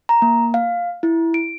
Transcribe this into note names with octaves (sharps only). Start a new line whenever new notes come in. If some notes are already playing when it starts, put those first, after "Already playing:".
A#5
A#3
F5
E4
D7